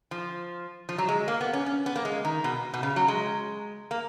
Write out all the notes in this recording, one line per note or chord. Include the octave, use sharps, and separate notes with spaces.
F3
F3
F#3
G#3
A#3
B3
C#4
C#4
B3
A#3
G#3
D#3
B2
B2
C#3
F#3
G#3
A#3